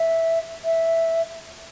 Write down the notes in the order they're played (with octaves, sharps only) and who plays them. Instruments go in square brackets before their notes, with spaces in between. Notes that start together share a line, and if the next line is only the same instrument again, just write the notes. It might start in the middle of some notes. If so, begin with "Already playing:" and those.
Already playing: [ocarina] E5
E5